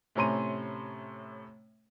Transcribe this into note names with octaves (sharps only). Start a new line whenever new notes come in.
A2 C3 C#4 A#5 C6 D#7